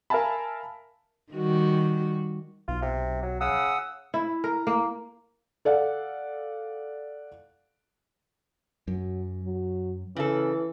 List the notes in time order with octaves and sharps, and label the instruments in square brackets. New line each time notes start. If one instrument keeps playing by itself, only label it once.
[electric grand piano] A#4 E5 F5 G#5 A5 B5
[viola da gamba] D#3 G3 F#4
[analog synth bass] B1 [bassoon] F4
[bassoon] C3
F#3
[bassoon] C#3 [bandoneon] F#5 D#6 E6
[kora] E4
A#4
A#3
[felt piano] A4 D5 F5 F#5
[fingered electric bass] F#2 [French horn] F#3
[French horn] F#3
[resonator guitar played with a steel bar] C#3 A4 [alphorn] E3 [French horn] C#4